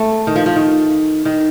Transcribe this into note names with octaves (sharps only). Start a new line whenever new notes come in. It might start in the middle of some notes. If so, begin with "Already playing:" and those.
Already playing: A3
D#3
F3
F3
D#3
D#3